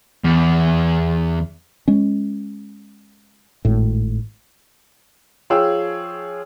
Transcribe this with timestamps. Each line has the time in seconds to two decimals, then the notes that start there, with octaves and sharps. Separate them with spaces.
0.24 E2
1.88 G#3 C#4
3.65 G#1 A2
5.50 F3 F4 G#4 C#5 G5 E6